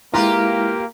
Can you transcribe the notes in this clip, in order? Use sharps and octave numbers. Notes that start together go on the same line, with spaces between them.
G#3 A#3 E4 F4 G4 B4 A#5